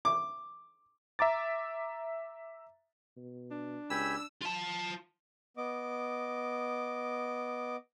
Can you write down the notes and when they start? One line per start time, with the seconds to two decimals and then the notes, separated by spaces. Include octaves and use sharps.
0.05 D6
1.19 E5 A#5 D6 A6
3.17 B2
3.51 D4
3.90 C#2 G4 G#5 B5 E6
4.42 F4 A5
5.57 B3 D#5 D6